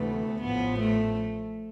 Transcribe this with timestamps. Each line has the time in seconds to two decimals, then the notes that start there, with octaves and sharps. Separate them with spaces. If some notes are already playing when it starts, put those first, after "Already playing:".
Already playing: D2 C3 E3 A3 B3
0.41 A1 A2 F3 B3
0.79 A3